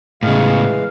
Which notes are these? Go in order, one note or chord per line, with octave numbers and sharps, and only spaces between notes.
A2 C#3 E3 G#3 F5